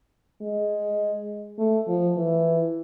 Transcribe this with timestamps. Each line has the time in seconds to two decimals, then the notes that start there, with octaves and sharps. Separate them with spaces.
0.41 G#3
1.58 A3
1.88 F3
2.17 E3